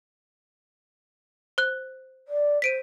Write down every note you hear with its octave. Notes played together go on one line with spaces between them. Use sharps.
C5 F#6
D5
C5 B6 D7 D#7